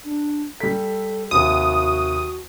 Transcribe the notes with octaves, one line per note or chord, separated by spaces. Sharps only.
D4
G3 A4 B6
D#2 C3 F#4 D#6